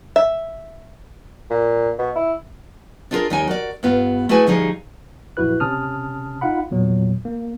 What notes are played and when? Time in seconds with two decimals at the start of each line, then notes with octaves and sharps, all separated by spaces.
0.16 E5
1.50 A#2
1.98 B2
2.16 E4
3.11 D4 D#4 F4 F#4 G#4 A#4
3.30 D#2 G3 D#4 G5 G#5
3.48 F#4 A#4 D5
3.83 G2 B3 F4
4.29 A3 E4 F#4 G#4 B4 G#5
4.47 D2 F3 G3 D#4 G#4
5.37 A#1 F#2 E4 F#4 B4 F#6
5.60 C3 C#4 A5 D#6 F6
6.41 D#4 F4 F5 F#5 B5
6.71 E2 A#2 F#3
7.25 A#3